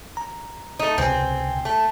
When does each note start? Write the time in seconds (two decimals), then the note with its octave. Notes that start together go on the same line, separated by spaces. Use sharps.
0.17 A#5
0.79 A3 D#4
0.98 C#2 C3 C4 G#5
1.65 A3